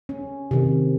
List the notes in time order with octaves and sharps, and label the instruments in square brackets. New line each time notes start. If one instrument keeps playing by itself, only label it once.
[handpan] C#4
C3 D#3